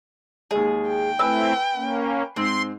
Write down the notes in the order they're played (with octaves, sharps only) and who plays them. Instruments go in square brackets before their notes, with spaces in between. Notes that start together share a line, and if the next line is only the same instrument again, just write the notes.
[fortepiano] D#2 G#3 [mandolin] G#4
[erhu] G5
[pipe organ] A3 C4 E4 [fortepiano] B4 G#5 [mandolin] E6
[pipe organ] A#3 C#4
[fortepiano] G#2 [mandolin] C4 [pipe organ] C6